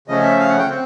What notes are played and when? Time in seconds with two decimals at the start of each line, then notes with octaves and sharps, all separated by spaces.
0.08 C#3 F3 A3 C#4 D#5
0.23 E5
0.39 F5
0.49 F#5
0.59 G5
0.69 C4